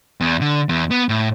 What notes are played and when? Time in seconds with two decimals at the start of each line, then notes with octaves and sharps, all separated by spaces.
0.21 E2
0.41 D3
0.69 E2
0.91 B3
1.09 A2